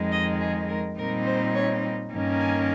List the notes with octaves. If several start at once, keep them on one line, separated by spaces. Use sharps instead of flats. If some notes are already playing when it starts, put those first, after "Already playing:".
Already playing: F2 D#3 G#3
D#5
G#4
A#4
A#2 G3 C4 D#4 A#4
C5
C#5
G2 D#3 A#3 C#4
G#5